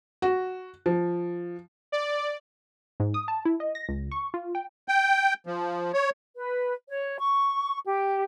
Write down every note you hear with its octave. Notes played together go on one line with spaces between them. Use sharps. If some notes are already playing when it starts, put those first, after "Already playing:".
F#4
F3
D5
G#2
D#6
A5
E4
D#5
A#6
C#2
C#6
F4
G5
G5
F3
C#5
B4
C#5
C#6
G4